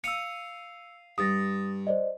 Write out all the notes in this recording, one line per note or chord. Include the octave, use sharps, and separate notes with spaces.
F5 D#6 E6 C#7
G2 D#6 A6 A#6
C5 D5 D#5